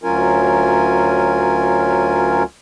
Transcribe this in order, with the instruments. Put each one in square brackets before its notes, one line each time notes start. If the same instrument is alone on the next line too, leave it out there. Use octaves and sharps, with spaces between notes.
[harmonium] D2 F#3 C#4 F4 A#4 G#5